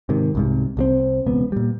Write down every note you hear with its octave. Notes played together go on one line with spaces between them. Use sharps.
G#2 C3 D#3
C2 G#2 C3
C2 G3 C4
E1 C#2 B3
A#2 G3